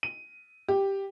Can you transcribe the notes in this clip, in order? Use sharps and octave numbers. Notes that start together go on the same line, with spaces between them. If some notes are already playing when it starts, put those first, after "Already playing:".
D#7
G4